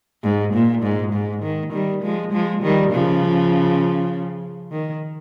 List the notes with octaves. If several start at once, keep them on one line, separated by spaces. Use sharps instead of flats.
G#2
A#2
G#2
G#2
D#3
D#3 G3
F3 G#3
F3 G#3
D#3 G3
C#3 F3
D#3